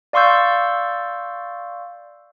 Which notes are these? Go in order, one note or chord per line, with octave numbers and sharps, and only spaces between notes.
D5 F5 C6 C#6 E6 G6